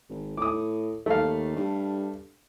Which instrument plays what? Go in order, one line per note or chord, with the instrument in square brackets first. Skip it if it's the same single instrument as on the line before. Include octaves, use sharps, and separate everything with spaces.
[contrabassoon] G#1
[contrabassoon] A2 [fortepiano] D6 D#6
[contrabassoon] D#2 [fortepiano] A3 F5
[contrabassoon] G2